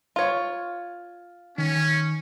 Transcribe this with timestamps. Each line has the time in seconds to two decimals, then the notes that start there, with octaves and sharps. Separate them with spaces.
0.16 F4 C#5
1.58 D#3 C#4